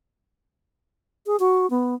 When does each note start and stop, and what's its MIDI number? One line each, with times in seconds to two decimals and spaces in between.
1.26 1.36 68
1.39 1.69 66
1.70 1.95 59